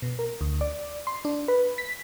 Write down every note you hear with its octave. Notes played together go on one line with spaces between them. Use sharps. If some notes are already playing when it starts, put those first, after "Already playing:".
B2
A#4
D2
D5
C6
D4
B4
B6